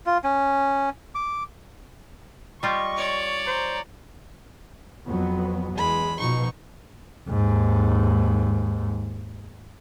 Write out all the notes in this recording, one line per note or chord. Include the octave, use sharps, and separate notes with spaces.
F4
C#4
D6
G3 F4 G4 D#5 C#6
C#5 D5
C5 A#5
F2 F#3 B3
E2 G#3 B5
B2 F3 D#4 C#6
D#2 G#2